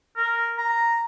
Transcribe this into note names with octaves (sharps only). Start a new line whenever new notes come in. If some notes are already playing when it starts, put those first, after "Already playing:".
A#4
A#5